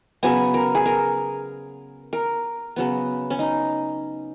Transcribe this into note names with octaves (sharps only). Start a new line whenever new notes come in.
C#3 F#3 B3 G#5
A#4
G#4
A#4
A#4
C#3 F#3 B3
C#4
D#4